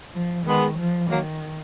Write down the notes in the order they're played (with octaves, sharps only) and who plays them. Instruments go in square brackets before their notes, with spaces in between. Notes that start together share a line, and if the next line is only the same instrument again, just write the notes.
[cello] F3
[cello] D#3 [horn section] G#3 B3
[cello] F3
[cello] D#3 [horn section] F#3 A#3